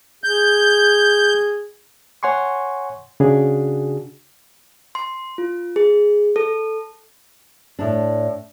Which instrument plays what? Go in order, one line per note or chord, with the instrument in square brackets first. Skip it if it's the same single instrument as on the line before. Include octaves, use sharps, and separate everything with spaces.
[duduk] G#4 [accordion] G6
[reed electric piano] C#5 F#5 G#5 C6 C#6
C#3 D4 F#4 G#4
[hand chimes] C6
F4
G#4
A4
[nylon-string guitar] A2 D4